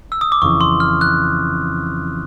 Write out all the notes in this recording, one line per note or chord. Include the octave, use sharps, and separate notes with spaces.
E6
D#6
D6
F2 C#3 E3 C#6
C6
F6
F#6